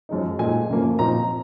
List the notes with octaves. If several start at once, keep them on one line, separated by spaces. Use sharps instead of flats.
F#2 F3 G#3 D#4
A#2 G#3 D#4 G#5
F#2 C#3 F3 A#3
A#2 F3 C4 D#4 A#5